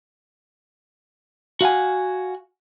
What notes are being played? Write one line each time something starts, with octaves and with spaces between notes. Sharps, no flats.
F#4 F5 F#5 G#5